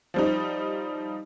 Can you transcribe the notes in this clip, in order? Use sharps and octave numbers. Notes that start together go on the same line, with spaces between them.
F3 G3 D#4